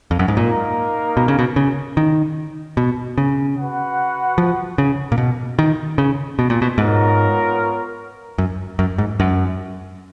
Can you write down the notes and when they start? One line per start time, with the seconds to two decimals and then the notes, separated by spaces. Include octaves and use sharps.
0.11 F2
0.19 F#2
0.28 G#2
0.36 A#2 A#3 D#4 A#4
1.17 B2
1.28 C#3
1.39 B2
1.56 C#3
1.97 D#3
2.77 B2
3.18 C#3
3.57 F#4 B4 F#5
4.38 F3
4.78 C#3
5.12 A#2
5.18 B2
5.59 D#3
5.98 C#3
6.39 B2
6.50 A#2
6.62 B2
6.78 G#2 B3 F4 A#4 C#5
8.38 F#2
8.79 F#2
8.98 G#2
9.20 F#2